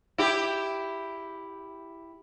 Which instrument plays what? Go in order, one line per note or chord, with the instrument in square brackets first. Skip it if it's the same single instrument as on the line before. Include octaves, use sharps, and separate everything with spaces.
[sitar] E4 G4